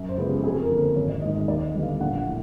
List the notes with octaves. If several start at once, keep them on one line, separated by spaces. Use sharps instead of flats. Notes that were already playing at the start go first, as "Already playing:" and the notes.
Already playing: F#2
C5
C#3 F3 G#3 B3
G4
A4
F2 G#4
A#4
D3 F3 A#3
C5
G#1 C#5
D5
G#2 D#3 D#5
D#5
D#2 D5
D#5
D3 G3 B3
F5
A#1 F#5
F#5
A2